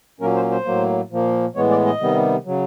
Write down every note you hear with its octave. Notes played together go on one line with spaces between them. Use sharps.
A#2 F#3 A#3 C#4 A#4
C5
C5
A2 F#3 A#3
A#2 F3 A#3
A2 E3 G#3 B3 C#5
D5
D#5
C3 D#3 G3 B3
C#3 F#3